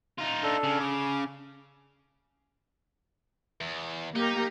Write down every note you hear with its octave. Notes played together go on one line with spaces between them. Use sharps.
D#4 F4
D4 A4
C#3
D6
E2
A#3 D#4 G4 A#4